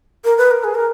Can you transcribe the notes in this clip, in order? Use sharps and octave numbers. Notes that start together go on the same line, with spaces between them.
A#4
B4
A#4
G#4
A#4